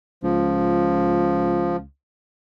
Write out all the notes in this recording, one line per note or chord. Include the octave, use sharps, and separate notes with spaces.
C#2 F3